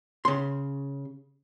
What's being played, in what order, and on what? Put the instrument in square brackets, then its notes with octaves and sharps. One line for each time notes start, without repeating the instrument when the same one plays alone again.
[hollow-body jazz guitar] C#3 C6